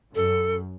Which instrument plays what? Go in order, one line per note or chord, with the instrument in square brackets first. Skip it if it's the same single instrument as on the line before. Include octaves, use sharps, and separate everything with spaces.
[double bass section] F#2 [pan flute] A4